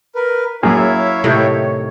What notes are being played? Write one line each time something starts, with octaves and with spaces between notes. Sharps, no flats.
A#4 B4
F#2 A#3 E4 G#4 C#5 E5 F5
A2 C3 D#3